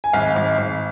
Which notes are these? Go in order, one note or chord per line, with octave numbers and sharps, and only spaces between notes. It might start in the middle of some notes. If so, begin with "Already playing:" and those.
G#5
G#1 F5
G#1
G#1